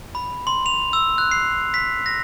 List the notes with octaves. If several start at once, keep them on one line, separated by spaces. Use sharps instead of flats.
B5
C6
F7
E6
F#6
C7
B6
A#6